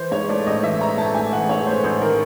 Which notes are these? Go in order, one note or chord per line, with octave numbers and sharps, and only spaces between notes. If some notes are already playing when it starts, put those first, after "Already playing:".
Already playing: E3 C5
G#2 C#5
A3 D5
A1 D#5
E3 E5
G#2 A#5
A3 A5
A1 G#5
E3 F#5
G#2 C#5
A3 C5
A1 C5
D#3 A#4